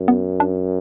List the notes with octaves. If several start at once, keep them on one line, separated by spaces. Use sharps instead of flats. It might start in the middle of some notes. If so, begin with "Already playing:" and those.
Already playing: F#2
B3
D4